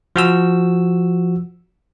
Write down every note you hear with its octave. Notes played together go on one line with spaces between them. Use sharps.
F3 F#4 E6